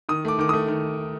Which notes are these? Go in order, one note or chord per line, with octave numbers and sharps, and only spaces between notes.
D#3 D#6
A3 D6
D#3 D6
D#6
A3
D#3